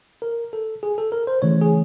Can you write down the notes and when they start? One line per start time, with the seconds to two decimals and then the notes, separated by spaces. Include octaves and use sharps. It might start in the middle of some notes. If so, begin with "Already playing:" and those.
0.22 A#4
0.53 A4
0.83 G#4
0.98 A4
1.12 A#4
1.27 C5
1.42 C#3 E3 A3 C#5
1.61 G#4